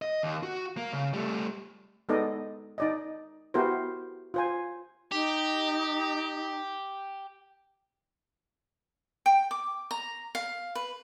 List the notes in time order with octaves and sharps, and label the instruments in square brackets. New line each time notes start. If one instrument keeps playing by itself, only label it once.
[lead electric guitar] D#5
D#2
F#4
A#3
C#3
G3 A3
[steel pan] G#3 B3 D#4 A4 D5 D#5
D#4 D5 D#5
B3 E4 F#4 G4 A#4 C5
F4 C5 G#5
[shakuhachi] D#4 [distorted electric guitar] G4
[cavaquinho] G5
D6
A#5
F5
B4